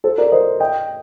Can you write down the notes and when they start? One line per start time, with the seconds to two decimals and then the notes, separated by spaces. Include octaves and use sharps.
0.04 A4 C5
0.18 A#4 D5
0.32 C5 D#5
0.60 D#5 G5